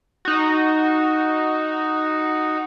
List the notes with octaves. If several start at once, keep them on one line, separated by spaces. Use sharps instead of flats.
D#4 F#4